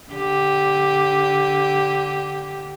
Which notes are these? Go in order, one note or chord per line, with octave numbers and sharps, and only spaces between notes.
D3 G4